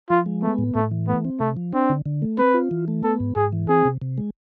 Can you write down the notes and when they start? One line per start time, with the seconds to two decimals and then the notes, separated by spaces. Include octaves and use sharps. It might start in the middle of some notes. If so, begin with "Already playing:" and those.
0.10 F3 F4
0.26 G#3
0.42 A3 B3
0.58 A2
0.75 A2 A3
0.91 E3
1.08 A3 B3
1.25 C4
1.40 C3 A3
1.57 F3
1.73 C4 D4
1.90 D3
2.06 D3
2.22 A3
2.38 C4 B4
2.54 F4
2.71 E3
2.88 A3
3.03 B3 A4
3.20 G#2
3.36 G#2 G#4
3.52 E3
3.69 C4 G#4
3.85 C3
4.02 C3
4.18 G#3